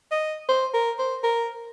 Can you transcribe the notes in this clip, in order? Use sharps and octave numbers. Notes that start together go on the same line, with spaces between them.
D#5
C5
A#4
C5
A#4